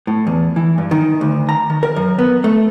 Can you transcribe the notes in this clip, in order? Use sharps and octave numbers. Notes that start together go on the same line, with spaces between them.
A2
E2
E3
G2
D#3
D2
A#5
D#3
A#4
F#2
B3
A3